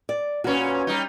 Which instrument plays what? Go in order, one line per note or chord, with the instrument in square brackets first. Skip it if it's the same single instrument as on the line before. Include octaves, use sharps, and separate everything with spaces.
[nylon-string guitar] D5
[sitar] A#2 C#4 [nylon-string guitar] F#4 B4
[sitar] G3 D#4